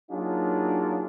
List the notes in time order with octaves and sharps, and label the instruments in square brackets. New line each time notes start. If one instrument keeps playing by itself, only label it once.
[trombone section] F#3 A#3 D4 D#4 F4 G#4